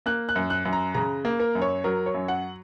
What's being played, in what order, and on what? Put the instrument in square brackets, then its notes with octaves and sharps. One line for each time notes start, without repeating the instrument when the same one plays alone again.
[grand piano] A#3 F#6
F#6
F#2
F#6
F#2
A#5
C#3 A#5
A#3
A#4
F#2
C#5
F#3 A#4
C#5
F#2
F#5